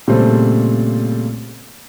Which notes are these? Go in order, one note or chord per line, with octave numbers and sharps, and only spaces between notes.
A#2 C#3 G3 A3 C4